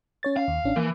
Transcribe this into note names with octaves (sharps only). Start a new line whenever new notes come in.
C#4 C#5 A6
C#4 F5
D#2
A1 C#4 D4
E3 A#3